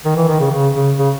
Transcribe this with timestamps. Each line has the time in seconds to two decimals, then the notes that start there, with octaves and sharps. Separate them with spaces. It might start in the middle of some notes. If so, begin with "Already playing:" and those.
0.05 D#3
0.16 E3
0.28 D#3
0.40 C#3
0.51 C#3
0.75 C#3
0.98 C#3